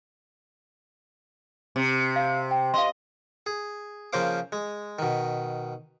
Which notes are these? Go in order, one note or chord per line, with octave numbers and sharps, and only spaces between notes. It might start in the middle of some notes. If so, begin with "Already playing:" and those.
C3
F5
G5
D#5 F5 C6
G#4
C#3 F3 A#3 C5 F5 D6
G#3
B2 D#3